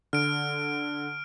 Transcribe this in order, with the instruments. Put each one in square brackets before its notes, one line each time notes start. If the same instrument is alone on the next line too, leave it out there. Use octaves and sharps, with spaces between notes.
[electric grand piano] D3 [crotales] F6 D7